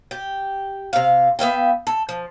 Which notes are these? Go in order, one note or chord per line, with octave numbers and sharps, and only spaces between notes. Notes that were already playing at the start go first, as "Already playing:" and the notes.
G4
C3 F5
B3 E5 F5 G5
A4
F3